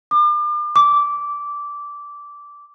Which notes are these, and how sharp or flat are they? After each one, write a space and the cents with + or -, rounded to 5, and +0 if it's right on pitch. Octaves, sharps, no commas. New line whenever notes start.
D6 +40
D6 -15